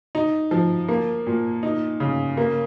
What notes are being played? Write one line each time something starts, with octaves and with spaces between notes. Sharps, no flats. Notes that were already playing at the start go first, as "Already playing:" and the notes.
D#4
F3
A#3
A#2
D#4
C#3
A#3